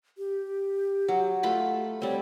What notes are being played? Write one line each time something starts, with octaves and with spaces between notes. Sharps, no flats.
G4
F#3
A3 F4 B5
G3 C4 C#5